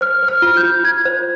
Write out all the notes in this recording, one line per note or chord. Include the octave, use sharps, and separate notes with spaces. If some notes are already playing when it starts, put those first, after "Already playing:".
C5 F6
C5
F6
F4
G6
F4
F4 G#6
C5